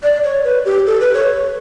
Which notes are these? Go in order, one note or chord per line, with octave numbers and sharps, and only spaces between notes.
D5
C#5
B4
G4
A4
B4
C#5